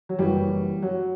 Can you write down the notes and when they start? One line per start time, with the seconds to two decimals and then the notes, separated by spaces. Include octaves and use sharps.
0.09 F#3
0.19 F#1 F#2 E3 G3
0.82 F#3